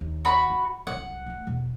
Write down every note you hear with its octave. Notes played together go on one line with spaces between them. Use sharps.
D#2
F#4 B5
F4
C2 F#2 F#5
A3 B3
E2 B2